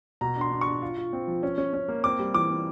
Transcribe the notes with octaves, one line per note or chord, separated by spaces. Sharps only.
B2 A#5
D4
C6
D4
C#6
D4
F4
F4
C4
F3
C#4
C#4
C#4
A#3
C4 D6
G3
E3 D6
C4